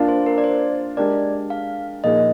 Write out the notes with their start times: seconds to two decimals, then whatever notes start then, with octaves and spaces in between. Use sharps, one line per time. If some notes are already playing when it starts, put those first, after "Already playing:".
Already playing: A#3 D4 F4
0.08 C5
0.26 A#4
0.38 D5
0.44 C5
0.97 G#3 D4 G4 A#4 D5
1.50 F5
2.04 A#2 F3 A#3 D#4 G#4 D#5